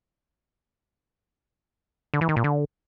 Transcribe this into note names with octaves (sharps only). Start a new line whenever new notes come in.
D3
E3
D#3
A#2
D3